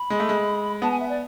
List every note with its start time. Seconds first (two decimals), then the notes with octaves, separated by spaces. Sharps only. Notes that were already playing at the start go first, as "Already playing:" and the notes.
Already playing: B5
0.10 G#3
0.20 A3
0.29 G#3
0.82 B3 A5
0.91 G#5
0.99 E5
1.09 D5